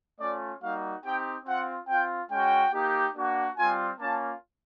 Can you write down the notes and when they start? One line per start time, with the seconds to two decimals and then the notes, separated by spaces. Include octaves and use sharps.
0.19 A3 C#4 F4 D5
0.62 G3 A#3 D#4 F#4 F5
1.03 C4 D#4 G4 G5
1.46 C4 F4 F#5
1.88 C4 F4 G5
2.30 G#3 C#4 F#4 G5
2.73 A#3 D#4 G4
3.16 A#3 D4 F#4
3.57 G3 C4 F4 G#5
3.99 A#3 C#4 F4 A5